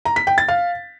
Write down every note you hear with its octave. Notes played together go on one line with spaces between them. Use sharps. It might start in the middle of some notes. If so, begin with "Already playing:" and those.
A#5
B6
G5
A6
F5